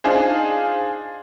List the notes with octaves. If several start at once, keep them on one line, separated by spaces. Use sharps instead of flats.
D4 D#4 F4 G#4 C5